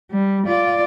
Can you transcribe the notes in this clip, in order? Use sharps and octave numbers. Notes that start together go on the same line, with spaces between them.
G3
F4 D5